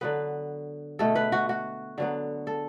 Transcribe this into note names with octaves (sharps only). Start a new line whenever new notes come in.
D3 F#3 B3 B4
B2 A3 A4
B4
F#4
F#4
D3 F#3 B3
A4